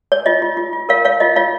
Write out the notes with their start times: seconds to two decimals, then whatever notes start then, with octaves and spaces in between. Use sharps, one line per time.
0.12 C#5
0.26 F4 D#5
0.42 F4
0.57 F4
0.73 F4
0.89 A#4 C#5 F5
1.05 C#5 F5
1.20 F4 D#5
1.36 F4 C#5 F5